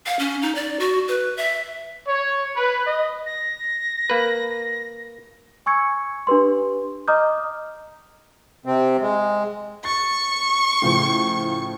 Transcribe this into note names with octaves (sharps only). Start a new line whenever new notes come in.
F5
C#4
D#4
D5
F#4
B4
E5
C#5
B4
D#5
A#6
A#3 B4
G#5 C#6 E6 G#6 C#7
D4 G4 B4 C6
D#5 A#5 D6 D#6 F6 G6
C3 C4
G#3
C#6 A6
A2 C#3 F3